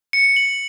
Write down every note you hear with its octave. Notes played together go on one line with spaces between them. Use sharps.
C#7
F#7